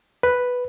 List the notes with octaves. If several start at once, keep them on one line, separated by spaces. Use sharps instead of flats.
B4